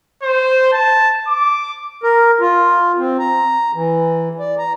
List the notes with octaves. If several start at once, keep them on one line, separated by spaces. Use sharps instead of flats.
C5
A5
D6
A#4
F4
C4
A#5
E3
D5
A#5